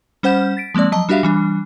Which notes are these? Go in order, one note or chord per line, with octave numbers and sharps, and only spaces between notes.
G3 C#4 C5 F#5 G6 E7
A6 B6 D7
F3 G#3 A#3 C4 D5
F3 F#3 D#5 A5
G3 D4 F#4 G4 E5 F5
E3 G3 D4